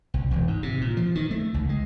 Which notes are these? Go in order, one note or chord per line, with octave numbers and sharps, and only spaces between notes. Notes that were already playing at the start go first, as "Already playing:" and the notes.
C2
E1
G#2
C3
A#2
F3
D#3
A3
C#2
G#3